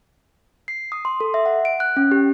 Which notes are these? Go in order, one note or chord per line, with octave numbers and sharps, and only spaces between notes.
C7
D#6
C6
A4
E5
F#5
D7
F#6
C#4
G4